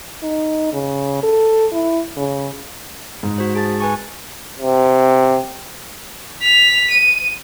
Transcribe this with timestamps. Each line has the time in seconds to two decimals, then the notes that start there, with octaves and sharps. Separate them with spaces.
0.23 D#4
0.73 C#3
1.23 A4
1.73 E4
2.17 C#3
3.23 G#2
3.38 F#4 C5
3.55 G#4 A5 A6
3.80 B4 G#5 C#6
4.59 C3
6.42 B6 F7
6.91 D#7